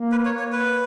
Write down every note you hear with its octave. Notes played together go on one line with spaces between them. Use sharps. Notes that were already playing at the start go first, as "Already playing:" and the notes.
Already playing: A#3
B4
C#5
C#5
B4